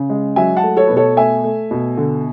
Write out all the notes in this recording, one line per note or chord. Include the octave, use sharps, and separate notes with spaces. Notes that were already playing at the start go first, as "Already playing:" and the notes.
Already playing: C#3
G#3
F#3 E5 G#5
F#5 A5
A3
A4 C#5
B2 B4
A4 C#5
A3 E5 G#5
A3
B2
D3